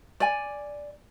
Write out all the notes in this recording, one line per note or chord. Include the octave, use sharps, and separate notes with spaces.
D5 G#5